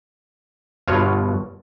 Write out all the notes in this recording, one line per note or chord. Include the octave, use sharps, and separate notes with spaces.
G1 G2 B2 F4 F#4 C#5